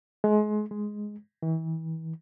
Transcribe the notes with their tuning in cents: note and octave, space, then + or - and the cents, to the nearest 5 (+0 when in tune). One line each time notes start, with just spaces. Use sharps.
G#3 +30
G#3 +5
E3 -35